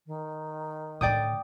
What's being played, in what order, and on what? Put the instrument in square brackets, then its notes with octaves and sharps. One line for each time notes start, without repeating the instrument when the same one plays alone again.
[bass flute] D#3
[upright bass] A2 D3 [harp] D5 G5 D#6